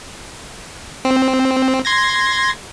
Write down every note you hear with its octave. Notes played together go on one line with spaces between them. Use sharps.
C4
C6 G#6 A#6